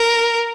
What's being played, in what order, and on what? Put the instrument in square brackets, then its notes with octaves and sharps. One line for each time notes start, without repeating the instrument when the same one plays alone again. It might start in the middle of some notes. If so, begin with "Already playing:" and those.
Already playing: [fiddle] A#4